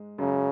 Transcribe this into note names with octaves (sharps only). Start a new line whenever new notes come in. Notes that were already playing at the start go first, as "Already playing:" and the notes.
Already playing: G#2 G#3
F#2 C#3 F#3